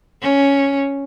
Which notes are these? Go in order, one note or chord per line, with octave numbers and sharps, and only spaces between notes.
C#4